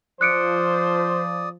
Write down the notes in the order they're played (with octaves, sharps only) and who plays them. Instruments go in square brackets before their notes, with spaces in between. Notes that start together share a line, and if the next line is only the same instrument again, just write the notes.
[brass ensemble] F3 [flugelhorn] C5 [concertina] D5 D#6 [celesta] F#6 C#7 D7